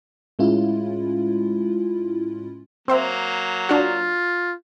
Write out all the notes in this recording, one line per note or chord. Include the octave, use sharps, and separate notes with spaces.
A2 G#3 C#4 E4 F4
F#3 A#3 C4 C5 E5
D4 F4 F#4